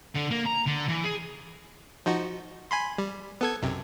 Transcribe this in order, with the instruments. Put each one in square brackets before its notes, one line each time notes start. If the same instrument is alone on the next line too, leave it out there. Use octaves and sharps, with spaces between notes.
[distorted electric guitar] D3
A#3
A#5
D3
E3
G#4
[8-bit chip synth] F3 D#4 F#4
G#5 B5 C6
G3
B3 A4 G#6
B1 F#2 C3